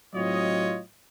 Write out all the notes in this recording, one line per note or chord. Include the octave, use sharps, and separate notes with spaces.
A2 F#3 C4 F4 C#5 D#5